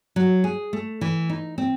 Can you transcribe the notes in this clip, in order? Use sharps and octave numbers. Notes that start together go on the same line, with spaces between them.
F#3
G#4
A3
E3
D#4
C4